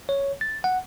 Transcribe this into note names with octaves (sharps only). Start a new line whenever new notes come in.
C#5
A6
F#5